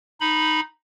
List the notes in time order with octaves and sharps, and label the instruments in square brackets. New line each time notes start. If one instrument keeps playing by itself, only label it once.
[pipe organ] D#4 B5